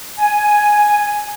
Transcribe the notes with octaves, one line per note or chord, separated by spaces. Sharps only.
G#5